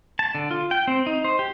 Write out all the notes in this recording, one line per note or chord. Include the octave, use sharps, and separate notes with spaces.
A5
D3
F4
G5
C4
D#4
C5
G4